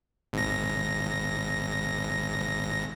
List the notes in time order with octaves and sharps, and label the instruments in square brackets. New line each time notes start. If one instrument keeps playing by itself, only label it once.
[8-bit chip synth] G#1 A#6